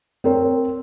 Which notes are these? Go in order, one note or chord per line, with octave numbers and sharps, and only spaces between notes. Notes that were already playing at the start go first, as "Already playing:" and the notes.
C4 A#4 C#5